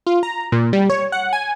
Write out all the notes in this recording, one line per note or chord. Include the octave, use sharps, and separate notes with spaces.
F4
A#5
A#2
G3
C#5
F#5
G#5